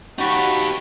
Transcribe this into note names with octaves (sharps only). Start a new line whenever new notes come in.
D#4 F#4 G4 A5 B5 C#6